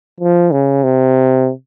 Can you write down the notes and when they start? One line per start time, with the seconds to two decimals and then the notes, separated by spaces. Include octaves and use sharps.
0.20 F3
0.52 C#3
0.84 C3